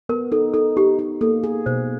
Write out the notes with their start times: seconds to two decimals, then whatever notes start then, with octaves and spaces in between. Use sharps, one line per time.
0.09 B3 A#4
0.32 D#4 A4
0.54 D#4 A4
0.77 D#4 G4
0.99 D#4
1.21 A#3 A4
1.44 G#4
1.66 B2 C5